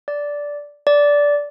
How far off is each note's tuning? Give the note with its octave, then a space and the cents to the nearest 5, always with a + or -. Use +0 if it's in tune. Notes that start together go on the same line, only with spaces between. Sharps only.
D5 -10
D5 -15